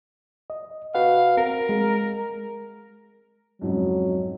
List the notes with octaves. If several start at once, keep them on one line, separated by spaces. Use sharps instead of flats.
D#5
F#4 B4 F5 F#5
C4 A#4
G#3
F2 G#2 C#3 F#3